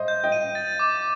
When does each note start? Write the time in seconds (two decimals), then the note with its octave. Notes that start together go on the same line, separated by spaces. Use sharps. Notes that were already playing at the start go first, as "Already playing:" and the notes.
Already playing: C5 D#5
0.08 G6
0.24 D#5 G5
0.32 D#7
0.55 A6
0.79 D6